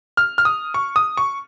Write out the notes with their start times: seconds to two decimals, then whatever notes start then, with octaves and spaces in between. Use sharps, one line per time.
0.17 F6
0.38 F6
0.45 D#6
0.74 C#6
0.96 D#6
1.17 C#6